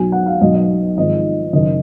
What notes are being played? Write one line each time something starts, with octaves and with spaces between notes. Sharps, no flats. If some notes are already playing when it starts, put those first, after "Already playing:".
Already playing: B1 B2 F#3 G#5
F#5
F5
B1 B2 F#3 D#5
D#5
G#1 G#2 F3 D#5
F#1 F#2 D#3 F#3 D#5